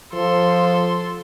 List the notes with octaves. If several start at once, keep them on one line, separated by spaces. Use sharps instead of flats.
F3 A4 C6